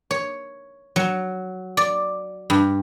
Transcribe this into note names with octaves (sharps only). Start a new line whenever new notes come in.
C#5
F#3
D5
G2